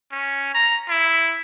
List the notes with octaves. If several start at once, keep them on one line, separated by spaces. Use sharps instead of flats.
C#4
A#5
E4